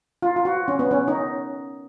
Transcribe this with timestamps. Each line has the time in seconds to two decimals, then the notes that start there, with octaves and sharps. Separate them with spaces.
0.22 F4
0.36 F4
0.45 F#4
0.68 C#4
0.79 B3
0.91 C#4
1.08 D#4